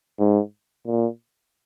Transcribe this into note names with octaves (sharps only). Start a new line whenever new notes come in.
G#2
A#2